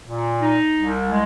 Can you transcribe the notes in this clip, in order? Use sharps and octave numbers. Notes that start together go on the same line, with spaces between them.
A#2
D#4
C2
G#3